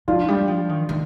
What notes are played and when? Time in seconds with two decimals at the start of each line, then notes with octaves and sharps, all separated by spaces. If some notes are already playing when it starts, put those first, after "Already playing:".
0.08 F3 D4 F4
0.28 G3
0.48 F3
0.69 D#3
0.89 D#3